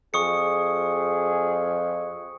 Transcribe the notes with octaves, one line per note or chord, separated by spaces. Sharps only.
F2 G#4 C#6 D#6 C#7